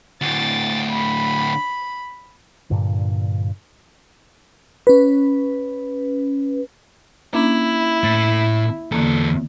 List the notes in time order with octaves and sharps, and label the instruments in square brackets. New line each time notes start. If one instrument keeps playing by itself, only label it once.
[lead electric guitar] D2 A2 [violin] A6 D7
[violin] B5
[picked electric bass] G2 A#2 D3
[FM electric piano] C#4 B4
[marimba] A#3 C#4 D4 [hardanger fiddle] E4
[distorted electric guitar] A2 [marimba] A6
[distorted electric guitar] E2 A4 [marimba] D3 A#3